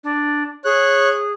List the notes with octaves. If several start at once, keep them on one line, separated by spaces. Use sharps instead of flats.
D4
G#4 C#5 F#6